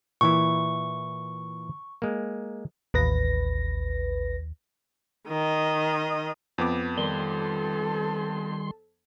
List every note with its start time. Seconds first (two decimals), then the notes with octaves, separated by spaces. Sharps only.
0.21 A#2 E3 E4 C#6
2.02 G#3 A#3
2.94 A1 D#2 B4 A#6
5.28 D#3 D#5
6.58 F2 B3 D6
6.98 D#3 G3 A4 C6